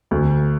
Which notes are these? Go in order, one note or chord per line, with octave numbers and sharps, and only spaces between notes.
D2